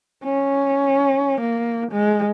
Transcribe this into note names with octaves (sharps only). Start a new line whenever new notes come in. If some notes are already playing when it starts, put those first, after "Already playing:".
C#4
A#3
G#3